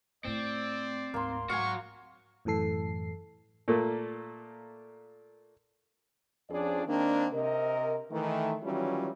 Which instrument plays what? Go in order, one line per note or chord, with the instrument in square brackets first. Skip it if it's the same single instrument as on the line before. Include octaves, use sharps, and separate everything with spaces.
[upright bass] A2 A3 [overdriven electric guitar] C4 [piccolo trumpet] D5
[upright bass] D2 G#2 [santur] A#3 C6
[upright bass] G#2 [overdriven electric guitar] F#3 F#4 [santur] F5 G#5 [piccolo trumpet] C#6
[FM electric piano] F#2 A2 E3 A4 C7
[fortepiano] A#2 A3 A#3
[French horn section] F2 F3 C#4 D4 G#4 D5
D#3 A#3 C4 D4
C3 A#4 D#5
D#3 E3 A3
D#3 E3 F#3 G3 C#4 F4